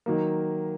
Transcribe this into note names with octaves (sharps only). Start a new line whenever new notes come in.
D#3 F#3 A#3